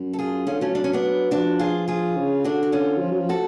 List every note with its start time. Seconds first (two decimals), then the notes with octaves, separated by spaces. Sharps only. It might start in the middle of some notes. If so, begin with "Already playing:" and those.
Already playing: F#2
0.13 A4
0.19 F4 G#4
0.47 D3 C#4 F4
0.61 F#3 A3 C#4
0.75 D4
0.84 C#4
0.93 B3 D4
1.31 F3 D4 F#4
1.59 F4 G#4
1.88 F4 G#4
2.16 C#3
2.44 D3 D4 F#4
2.63 F#4
2.72 C#4 F4
2.97 F#3
3.01 F3
3.11 F#3
3.20 F3
3.29 F#4 A4